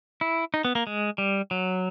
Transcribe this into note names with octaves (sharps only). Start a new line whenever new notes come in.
E4
D#4
B3
A#3
G#3
G3
F#3